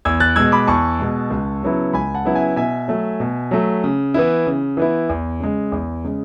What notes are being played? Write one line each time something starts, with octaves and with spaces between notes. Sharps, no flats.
E2 E6 G#6
F#6 A6
B2 G#3 E6 G#6
B5 D6
E2 A5 C#6
B2 G#3
C#2
C#3 F#3 B3 E4
C#2 G#5 B5
F#5 A5
C#3 F#3 B3 E4
E5 G#5
B2 E5 G#5
F#3 A3
B2
F#3 A3
C#3
E3 B3 E4
C#3
E3 B3 E4
E2
C#3 G#3
E2
C#3 G#3